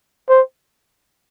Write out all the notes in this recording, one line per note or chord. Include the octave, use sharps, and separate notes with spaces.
C5